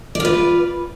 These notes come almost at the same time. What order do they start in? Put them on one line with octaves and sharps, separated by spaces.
D5 F4 B4